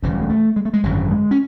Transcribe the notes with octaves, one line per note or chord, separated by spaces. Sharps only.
E1 D2 C#3 E3
F#3
G#3
A3
G#3
A3
G#3
G#1 F#2 D3 F#3
G#3
C#4